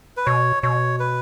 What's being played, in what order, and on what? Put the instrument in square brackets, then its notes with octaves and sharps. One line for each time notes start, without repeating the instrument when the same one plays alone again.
[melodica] B4
[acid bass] B2 [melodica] C#5
[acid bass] B2 [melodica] C#5
[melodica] B4